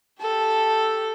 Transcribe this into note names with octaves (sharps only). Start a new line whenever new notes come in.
G4 A4